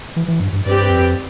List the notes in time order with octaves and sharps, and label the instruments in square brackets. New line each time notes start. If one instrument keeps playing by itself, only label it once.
[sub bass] E3
E3
G2
G2
[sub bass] G2 [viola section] C4 G4 B4 D5
[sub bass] F2